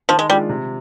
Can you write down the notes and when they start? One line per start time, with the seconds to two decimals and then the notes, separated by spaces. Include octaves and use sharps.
0.09 D#3 F3
0.19 G#3
0.29 G3 G#3 D4 F4
0.49 C3